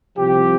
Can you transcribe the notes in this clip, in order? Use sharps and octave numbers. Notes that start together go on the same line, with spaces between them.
C2 C3 F3 G4